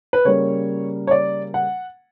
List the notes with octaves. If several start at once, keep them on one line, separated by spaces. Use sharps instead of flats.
B4
C#3 G3 A#3 C#5
C#5
D5
F#5